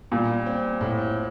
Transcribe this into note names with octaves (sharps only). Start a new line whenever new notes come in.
A#2 G3
C4
A2